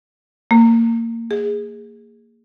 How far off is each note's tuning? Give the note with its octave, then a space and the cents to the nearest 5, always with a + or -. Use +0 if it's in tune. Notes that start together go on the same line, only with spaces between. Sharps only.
A#3 -25
G#4 -15